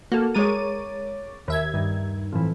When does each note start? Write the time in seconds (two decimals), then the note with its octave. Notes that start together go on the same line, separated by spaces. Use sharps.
0.12 A#3 F#4 A4
0.34 G#3 A#4 C#5 D6 A6 D#7
1.48 D#2 E5 G#6
1.74 G2 D#3
2.33 F2 A2 E3